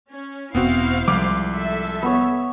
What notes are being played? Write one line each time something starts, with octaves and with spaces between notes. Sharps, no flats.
C#4
E1 B3 C4 E4 F#4 C5 F5
C2 F3 G#3 D6
A4 E5
B3 C#5